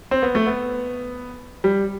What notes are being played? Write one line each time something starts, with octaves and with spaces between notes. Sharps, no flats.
C4
B3
A3
B3
G3